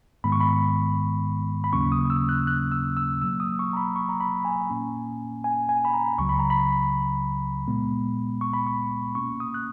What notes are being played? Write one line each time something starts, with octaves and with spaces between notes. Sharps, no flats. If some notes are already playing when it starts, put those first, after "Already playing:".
G#2 D#3 G#3 B3 B5
C#6
B5
B5
D#2 C#3 F#3 A#3 C#4 C#6
D#6
E6
F#6
F#6
E6
E6
B2 F#3 A#3 E6
D#6
C#6
A#5
B5
C#6
A#5
B5
G#5
A#2 A#3 C#4
G#5
G#5
B5
A#5
C#2 C#3 F#3 C#6
B5
A#5
B5
A#2 G#3 B3
C#6
B5
C#6
B2 A#3 C#4 C#6
D#6
F#6